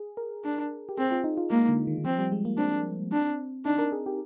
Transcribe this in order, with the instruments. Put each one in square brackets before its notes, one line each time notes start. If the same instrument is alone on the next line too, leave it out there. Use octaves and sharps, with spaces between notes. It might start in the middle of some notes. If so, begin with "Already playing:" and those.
Already playing: [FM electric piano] G#4
A#4
[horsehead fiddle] D4
[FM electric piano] G4
[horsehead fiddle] C4 [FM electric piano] G#4
[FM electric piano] F4
D#4
F4
[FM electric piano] G#3 [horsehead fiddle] A#3
[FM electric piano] D3
D#3
D#3
[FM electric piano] F3 [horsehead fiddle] C4
[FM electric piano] G3
G#3
A#3
[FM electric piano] C4 [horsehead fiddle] D4
[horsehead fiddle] D4
[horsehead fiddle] D4 [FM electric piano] D#4
[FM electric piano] A#4
G#4
G4